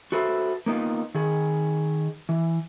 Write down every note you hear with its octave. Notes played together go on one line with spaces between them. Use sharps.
F#4 A4 B4 C5 E5
A#3 B3 D#4 F4
D#3 G#4
E3